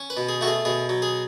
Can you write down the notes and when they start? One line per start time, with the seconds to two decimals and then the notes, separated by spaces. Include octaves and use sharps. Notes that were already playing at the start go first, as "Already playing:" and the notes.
Already playing: C#4
0.10 B4
0.17 B2
0.29 G#4
0.41 A3 F#4
0.47 G#4
0.65 B2 G#4
0.89 F#3
1.02 G#4